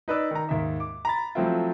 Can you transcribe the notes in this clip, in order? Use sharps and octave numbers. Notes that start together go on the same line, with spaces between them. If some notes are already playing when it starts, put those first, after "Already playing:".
D#4 B4 D5 E6
D#3 A#5
D#2 G#2 E5
D6
A#5 B5 A6
F3 F#3 A3 C4 E4 F4